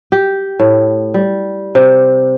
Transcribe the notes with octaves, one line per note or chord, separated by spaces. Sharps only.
G4
A2
G3
C3